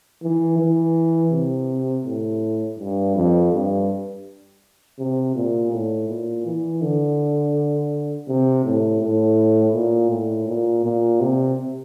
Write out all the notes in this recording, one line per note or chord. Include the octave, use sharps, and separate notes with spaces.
E3
E3
C3
A2
G2
F2
G2
C3
A#2
A2
A#2
E3
D3
C3
A2
A2
A#2
A2
A#2
A#2
C3